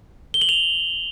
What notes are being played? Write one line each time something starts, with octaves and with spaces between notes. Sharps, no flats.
G7
F#7
F7